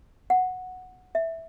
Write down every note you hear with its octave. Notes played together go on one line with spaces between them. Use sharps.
F#5
E5